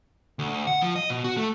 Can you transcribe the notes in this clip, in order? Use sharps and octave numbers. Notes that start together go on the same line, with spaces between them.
D2
F#5
F3
D#5
B2
F#4
A3